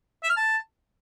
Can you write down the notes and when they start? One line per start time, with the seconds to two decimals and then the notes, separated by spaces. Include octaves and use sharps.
0.23 E5
0.30 F6
0.36 A5